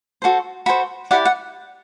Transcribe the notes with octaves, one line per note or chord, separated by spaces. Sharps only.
F#4 A4 C5
F#4 A4 C5 B5
E4 G4 D5 F#5
F#5